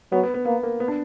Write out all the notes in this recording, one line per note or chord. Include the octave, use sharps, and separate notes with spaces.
F#3 B3
B3
B3
A#3 B3
A#3
B3
D4